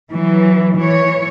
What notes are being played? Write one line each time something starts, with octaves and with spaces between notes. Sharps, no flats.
E3 F#3
E3 C#5